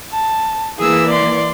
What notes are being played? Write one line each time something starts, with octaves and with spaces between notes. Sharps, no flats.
A5
E3 A#3 G#4 E6
D5 C6